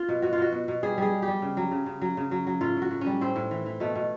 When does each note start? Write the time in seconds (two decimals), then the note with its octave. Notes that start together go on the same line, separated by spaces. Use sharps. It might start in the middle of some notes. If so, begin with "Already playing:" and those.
Already playing: F4
0.09 B2
0.22 B2 F#4
0.33 F4
0.38 B2 F#4
0.52 B2
0.68 B2
0.83 G3 G#4
0.98 G3 G#4
1.12 B2
1.22 G4
1.28 G3
1.42 C#3
1.57 F#3
1.71 C#3
1.86 C#3
2.01 F#3
2.17 C#3
2.31 F#3
2.47 F#3
2.61 A2 F4
2.77 A2 F#4
2.91 A2
3.01 C#4
3.06 G3
3.21 A2 C4
3.36 A2
3.51 E3
3.66 E3
3.80 B2 A3
3.95 B2